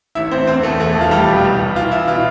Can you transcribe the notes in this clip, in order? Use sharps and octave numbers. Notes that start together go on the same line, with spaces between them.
A1 E4 E5
A1 C4 C5
E2 C4 C5
E2 A3 A4
E1 A3 A4
E2
F4
F1 G3 G4
B2
C2
C2
E3 F4
E3 E4
B2 F4